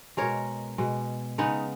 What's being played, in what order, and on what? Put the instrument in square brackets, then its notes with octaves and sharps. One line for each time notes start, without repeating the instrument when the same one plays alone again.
[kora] B2 G#3 A#4 C#5
B2 G#3
C#3 G#3 B3 D#4